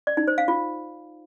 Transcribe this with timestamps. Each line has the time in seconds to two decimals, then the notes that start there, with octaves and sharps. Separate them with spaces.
0.07 D5
0.17 D#4
0.28 C5
0.38 F5
0.48 F4